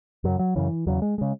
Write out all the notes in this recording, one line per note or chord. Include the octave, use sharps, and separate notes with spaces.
F#2 C#3 F#3
F#3
F#2 C#3 E3
E2 C#3 F#3
G#3
C#3 G#3